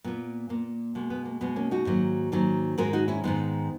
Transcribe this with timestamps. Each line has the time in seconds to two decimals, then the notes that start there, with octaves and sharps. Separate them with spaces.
0.04 A#2 A#3 B3
0.49 A#2 A#3
0.95 B2 G#3 A#3
1.10 B3
1.25 A#3
1.41 B2 G#3 B3
1.56 A#3 C#4
1.71 D#4 F#4
1.86 G#2 D#3 F#3 A#3
2.32 G#2 D#3 F#3 A#3
2.78 G#2 D#3 G#3 F#4 A#4
2.93 D#4 F#4
3.08 C#4 E4
3.24 G#2 D#3 G#3 B3 D#4